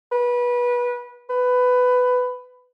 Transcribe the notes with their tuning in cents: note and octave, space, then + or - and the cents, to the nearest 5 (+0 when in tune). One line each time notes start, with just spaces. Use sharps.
B4 -25
B4 +15